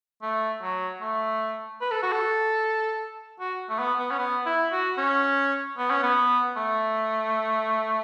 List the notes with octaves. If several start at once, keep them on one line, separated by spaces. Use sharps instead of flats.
A3
F#3
A3
B4
A4
F#4
A4
F#4
A3
B3
B3
C#4
B3
E4
F#4
C#4
B3
C#4
B3
A3